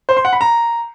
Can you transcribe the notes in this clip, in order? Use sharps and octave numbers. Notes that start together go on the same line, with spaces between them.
C5
C6
F#5
B5
A#5